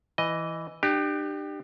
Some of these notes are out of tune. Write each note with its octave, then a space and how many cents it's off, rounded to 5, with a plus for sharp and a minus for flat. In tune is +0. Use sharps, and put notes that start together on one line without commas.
E3 +0 D#5 +0
D4 +40 G4 +0